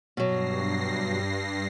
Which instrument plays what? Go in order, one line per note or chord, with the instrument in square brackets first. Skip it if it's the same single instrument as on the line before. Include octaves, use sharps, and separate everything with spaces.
[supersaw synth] G2 A#6 C7 [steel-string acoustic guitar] B2 F#3